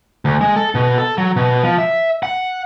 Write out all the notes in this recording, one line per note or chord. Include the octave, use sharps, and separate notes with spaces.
D2
G#3
A4
B2
A4
F#3
B2
F3
E5
F#5